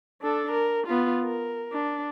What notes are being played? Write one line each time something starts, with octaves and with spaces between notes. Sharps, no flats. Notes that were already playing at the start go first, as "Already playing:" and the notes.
D4 A4
A#4
B3 F4
A#4
D4